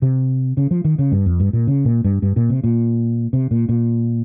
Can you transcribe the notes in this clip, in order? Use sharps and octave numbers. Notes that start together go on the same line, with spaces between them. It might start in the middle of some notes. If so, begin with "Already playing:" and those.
C3
C#3
F3
D#3
C#3
G2
F2
G2
A#2
C#3
A#2
G2
G2
A#2
C3
A#2
C3
A#2
A#2